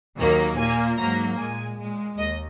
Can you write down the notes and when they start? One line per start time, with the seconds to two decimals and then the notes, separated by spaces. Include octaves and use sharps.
0.18 D#2 D#3 F#3 A#3
0.58 A#2 A#3 G#5
0.98 G#2 F#3 A#3 A#5
1.38 A#2 G#3 G#5
1.79 A#2 G#3
2.18 D#2 D#5